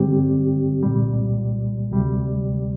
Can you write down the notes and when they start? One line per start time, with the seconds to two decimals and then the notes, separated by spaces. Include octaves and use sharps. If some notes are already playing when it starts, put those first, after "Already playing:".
Already playing: G2 D3 G3 C4 G4
0.82 C2 A#2 G3
1.91 D2 C3 G3